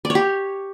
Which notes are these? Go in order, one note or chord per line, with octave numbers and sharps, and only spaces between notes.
D5
C#5
G4